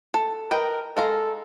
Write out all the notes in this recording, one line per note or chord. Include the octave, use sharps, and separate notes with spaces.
A4
A#4 B4 D#5 G5
G#3 A4 F5 A#5